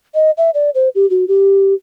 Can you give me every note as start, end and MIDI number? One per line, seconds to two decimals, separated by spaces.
0.14 0.31 75
0.37 0.50 76
0.54 0.70 74
0.75 0.89 72
0.95 1.08 67
1.10 1.27 66
1.28 1.74 67